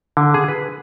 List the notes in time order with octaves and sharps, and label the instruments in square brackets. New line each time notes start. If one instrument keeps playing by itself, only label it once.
[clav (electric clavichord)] D3
G#4
B4